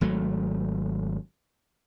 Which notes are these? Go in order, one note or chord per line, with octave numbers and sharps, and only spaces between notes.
G#1 F#3 A3